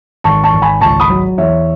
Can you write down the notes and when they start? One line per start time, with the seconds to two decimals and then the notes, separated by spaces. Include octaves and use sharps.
0.24 G#1 A5 C#6
0.44 A5 C#6
0.53 G#1
0.62 G#5 B5
0.81 C#2 A5 C#6
1.00 B5 D#6
1.10 F#3
1.38 E2 C#5 E5